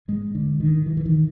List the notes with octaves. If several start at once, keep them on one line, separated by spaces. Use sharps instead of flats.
G#2 G#3
D3
D#3
E3
E3
D#3